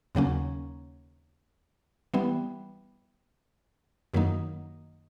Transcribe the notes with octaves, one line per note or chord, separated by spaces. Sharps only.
D#2 C#3 F#3 A#3 C#4
E3 G3 B3
F#2 D#3 F#3 A#3 D#4